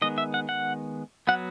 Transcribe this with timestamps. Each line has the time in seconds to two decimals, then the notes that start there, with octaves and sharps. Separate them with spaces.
0.02 D#3 G#3 B3 D#5
0.18 E5
0.34 F#5
0.49 F#5
1.27 F#3 B3 F#5